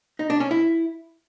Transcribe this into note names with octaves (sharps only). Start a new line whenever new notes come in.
D#4
D4
C#4
E4